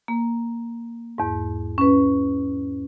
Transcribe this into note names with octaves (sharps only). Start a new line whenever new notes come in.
A#3
E2 G#2
C#4 B4